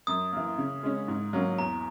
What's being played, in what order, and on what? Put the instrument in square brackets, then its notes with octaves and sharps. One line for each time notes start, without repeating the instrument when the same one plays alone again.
[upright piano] F#2 [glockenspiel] D#6
[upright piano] E3 A#3
C#3
G#3 C#4
G#2
F#3 A#3 C#4
[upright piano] E2 [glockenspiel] A#5